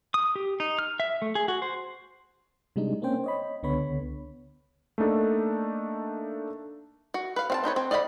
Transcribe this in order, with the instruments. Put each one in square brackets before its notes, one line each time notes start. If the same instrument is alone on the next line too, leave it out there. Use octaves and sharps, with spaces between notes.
[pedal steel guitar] D#6
G4
D#4
F6
E5
A3
G#4
F#4
C5
[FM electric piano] C3 G3 G#3 D4 D#4
A#3 C4 C#4 C5 G5
C#5 D#5 B5
C#2 D3 B3 C#5 B5
[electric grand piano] A3 A#3 D4 D#4 A4
[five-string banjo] F#4
B4 F5
C4 F5 A5
C4 D#4 B4 C#5
C4
D5 D#5 F5 F#5 B5